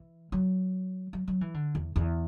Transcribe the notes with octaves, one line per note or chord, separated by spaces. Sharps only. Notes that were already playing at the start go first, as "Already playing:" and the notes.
Already playing: E3
F#3
F#3
F#3
E3
D3
E2
E2